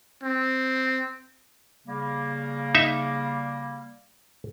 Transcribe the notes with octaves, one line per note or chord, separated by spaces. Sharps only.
C4
C#3 G3 A#3
D#4 E5